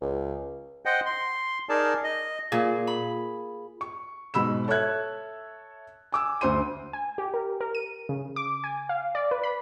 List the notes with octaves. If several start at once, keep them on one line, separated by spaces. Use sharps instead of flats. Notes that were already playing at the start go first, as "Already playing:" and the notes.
C#2
C5 D#5 F#5 G5
C6
D#4 G#4 A#4 D5 A5
D#5
A#2 G#4
B5
C#6
G#2 B2 B5 E6 E7
A4 C#5 E5 F#6 G#6
G#5 D6 E6
D2 C5 C6 D#7
G#5
G4
A#4
A#4
D#7
C#3
D6
G#5
F5
D5
B4
B5